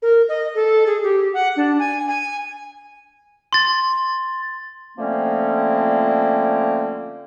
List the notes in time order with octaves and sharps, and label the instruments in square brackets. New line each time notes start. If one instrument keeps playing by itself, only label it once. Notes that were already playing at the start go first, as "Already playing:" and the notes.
[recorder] A#4
D#5
A4
G#4
G4
F#5
D4
G#5
G#5
[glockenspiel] C6 A6
[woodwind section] D3 F3 A3 A#3 C4 C#4